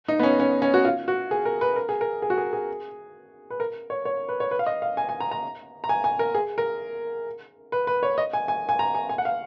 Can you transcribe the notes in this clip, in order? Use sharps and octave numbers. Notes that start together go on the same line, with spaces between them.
D#4
B3
C#4
C#4
C#4
F#4
F4
F#4
G#4
A#4
B4
A#4
G#4
A#4
G#4
F#4
G#4
G#4
B4
A#4
C#5
C#5
B4
C#5
B4
F5
D#5
F5
G#5
G#5
A#5
A#5
A#5
G#5
G#5
A#4
G#4
A#4
B4
B4
C#5
D#5
G#5
G#5
G#5
A#5
G#5
G#5
F#5
F5